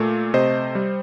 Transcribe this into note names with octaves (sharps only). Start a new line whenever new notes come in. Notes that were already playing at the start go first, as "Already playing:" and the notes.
Already playing: A#2 A3
C3 C5 D#5
G3